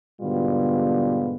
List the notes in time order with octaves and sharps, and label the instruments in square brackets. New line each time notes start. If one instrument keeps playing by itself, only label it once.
[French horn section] G#2 B2 D3 G3 B3 F4